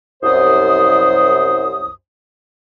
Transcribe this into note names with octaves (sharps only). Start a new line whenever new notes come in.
C2 F#2 C5 D#6